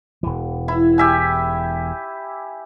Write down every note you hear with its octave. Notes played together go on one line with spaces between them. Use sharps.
E1 E3
E4
G4 E5 G#5